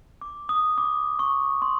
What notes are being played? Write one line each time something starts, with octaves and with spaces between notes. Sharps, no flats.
D6
D#6
D6
C#6
C6